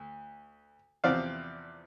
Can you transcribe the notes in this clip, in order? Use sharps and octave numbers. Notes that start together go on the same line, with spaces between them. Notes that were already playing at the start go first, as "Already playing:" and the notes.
Already playing: D2
E2 C3 F3 C4 D5 F5